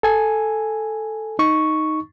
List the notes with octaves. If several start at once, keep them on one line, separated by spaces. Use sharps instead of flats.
A4 G#5
D#4 C#6